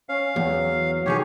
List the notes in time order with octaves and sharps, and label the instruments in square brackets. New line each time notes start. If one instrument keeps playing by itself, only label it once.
[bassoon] C#4 [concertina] F5
[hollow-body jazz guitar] E2 [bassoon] F#3
[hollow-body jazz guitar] B1 D#3 G#4 [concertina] G4 C#5